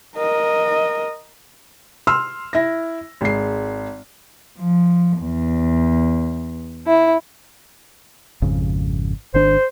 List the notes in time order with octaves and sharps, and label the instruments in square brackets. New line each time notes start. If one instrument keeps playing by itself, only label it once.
[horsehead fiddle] A#4 D#5
[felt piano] C6 E6 F6
E4 A#6
G#1 G#3 C7
[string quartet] F3
E2
E4
[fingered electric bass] G#1 F2 C#3
[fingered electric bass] G#1 D#3 D4 [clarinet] C5